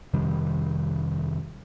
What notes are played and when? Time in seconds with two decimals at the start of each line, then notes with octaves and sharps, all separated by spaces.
0.13 F2 C3 D#3 G3